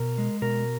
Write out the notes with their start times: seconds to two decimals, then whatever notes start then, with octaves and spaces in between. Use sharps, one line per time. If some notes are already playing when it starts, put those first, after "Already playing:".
Already playing: B2 A#4
0.18 G#3
0.42 B2 A#4